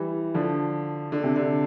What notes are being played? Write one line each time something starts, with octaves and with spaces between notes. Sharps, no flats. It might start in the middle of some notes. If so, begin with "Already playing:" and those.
Already playing: E3 G3
D3 F3
D3
C3
D3